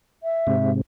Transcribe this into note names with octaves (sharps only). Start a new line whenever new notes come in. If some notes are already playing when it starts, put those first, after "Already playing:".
E5
G#2 C3